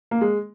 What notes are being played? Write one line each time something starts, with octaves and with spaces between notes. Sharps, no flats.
A#3
G#3